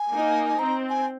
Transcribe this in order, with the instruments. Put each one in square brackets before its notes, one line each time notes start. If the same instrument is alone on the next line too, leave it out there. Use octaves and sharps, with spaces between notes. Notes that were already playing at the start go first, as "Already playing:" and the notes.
Already playing: [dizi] G#5
[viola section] A#3 D#4
[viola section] C4 [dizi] A#5
[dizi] G#5